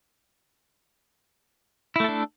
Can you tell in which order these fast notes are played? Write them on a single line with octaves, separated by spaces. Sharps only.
E4 A3 A4 D4